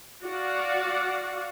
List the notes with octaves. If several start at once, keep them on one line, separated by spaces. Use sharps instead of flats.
F#4 D5 F5 F#5